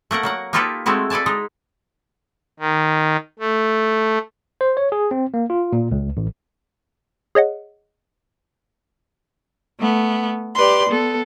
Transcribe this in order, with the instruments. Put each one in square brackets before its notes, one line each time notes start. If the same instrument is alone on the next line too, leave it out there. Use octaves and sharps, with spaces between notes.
[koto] A3 A#3 A#4 F#5
F#3 A#3 F#5
A#3 D#4 F4 G4 A4 B4
G#3 A3 C4 E4 F#4
A4 B4 D5 G#5 A5
G#3 D#4
[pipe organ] D#3
A3
[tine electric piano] C5
C#5
G#4
C4
A#3
F4
A#2
C#2
A1
[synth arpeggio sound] G#4 C#5 D#5 F#5
[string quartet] A3 B3
G4 B4 D5 C6
B3 A4